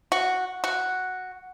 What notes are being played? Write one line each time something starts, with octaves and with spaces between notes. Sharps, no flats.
F#4
F#4